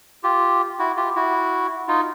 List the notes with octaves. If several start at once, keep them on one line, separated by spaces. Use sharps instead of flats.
F4 G4
E4 F#4
F4 G4
E4 F#4
D#4 F4